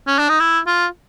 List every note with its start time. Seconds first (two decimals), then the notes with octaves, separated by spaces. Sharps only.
0.07 C#4
0.18 D4
0.29 D#4
0.40 E4
0.67 F4